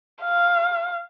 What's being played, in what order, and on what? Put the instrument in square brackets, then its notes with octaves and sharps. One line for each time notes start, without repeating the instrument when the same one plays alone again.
[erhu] F5